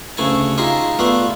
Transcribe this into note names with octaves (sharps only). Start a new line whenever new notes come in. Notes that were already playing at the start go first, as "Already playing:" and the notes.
D2 C#3 A3 E4 G#5 A5
D#4 F4 G4 G#4 E5
A3 B3 F4 D5 E5